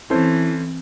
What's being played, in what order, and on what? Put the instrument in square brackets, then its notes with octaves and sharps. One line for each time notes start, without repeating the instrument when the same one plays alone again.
[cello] E3 [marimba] C4 [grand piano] C#4 A4 C5 [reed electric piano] E4